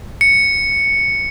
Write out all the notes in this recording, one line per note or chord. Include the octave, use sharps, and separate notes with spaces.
C#7